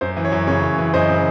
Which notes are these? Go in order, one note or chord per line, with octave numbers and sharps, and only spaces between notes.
F#2 C5
E3
C#5
F#2
C#3 C#5
F#2
E3
F#2 C5 D#5
C#3